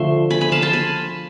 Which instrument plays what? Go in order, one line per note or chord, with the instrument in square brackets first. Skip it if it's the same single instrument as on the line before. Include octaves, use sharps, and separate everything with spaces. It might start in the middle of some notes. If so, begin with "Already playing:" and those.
Already playing: [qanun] D3 F3 A3 E5 C6
G#5 B5
G#5 B5
F5 A5
A5 C6
G#5 B5